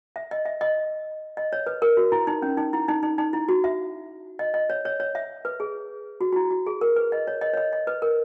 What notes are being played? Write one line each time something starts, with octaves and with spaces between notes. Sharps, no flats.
E5
D#5
E5
D#5
D#5
C#5
B4
A#4
F#4
E4
D#4
C#4
D#4
E4
D#4
D#4
D#4
E4
F#4
E5
D#5
D#5
C#5
C#5
C#5
E5
B4
G#4
F#4
F#4
E4
F#4
G#4
A#4
B4
D#5
C#5
D#5
C#5
D#5
D#5
B4
A#4